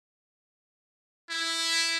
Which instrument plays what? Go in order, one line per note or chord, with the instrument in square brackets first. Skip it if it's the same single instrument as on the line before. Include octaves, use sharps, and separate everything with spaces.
[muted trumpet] E4